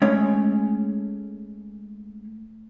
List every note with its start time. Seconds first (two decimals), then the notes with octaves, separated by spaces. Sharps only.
0.02 G#3 A3 C#4 C#5